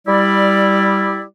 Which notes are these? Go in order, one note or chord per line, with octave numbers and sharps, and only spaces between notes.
G3 E4 D5